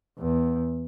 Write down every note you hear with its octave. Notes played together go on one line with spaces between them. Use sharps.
E2